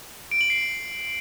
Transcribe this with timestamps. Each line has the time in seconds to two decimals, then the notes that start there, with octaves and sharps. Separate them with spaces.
0.31 D7
0.41 F#7
0.50 C7